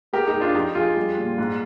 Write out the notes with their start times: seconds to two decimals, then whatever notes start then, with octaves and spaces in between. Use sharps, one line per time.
0.13 G#3 G4 A#4
0.27 D#4 G4
0.34 G#3
0.40 D4 F4
0.54 F2 D#4 G4
0.75 F2 F4 G#4
0.96 G3
1.18 A#2
1.38 G#2